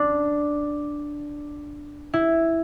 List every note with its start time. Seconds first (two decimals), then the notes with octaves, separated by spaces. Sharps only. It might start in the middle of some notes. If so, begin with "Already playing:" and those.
Already playing: D4
2.14 E4